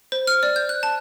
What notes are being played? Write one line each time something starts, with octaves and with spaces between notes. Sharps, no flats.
C5
F6
D5
G6
F#6
A5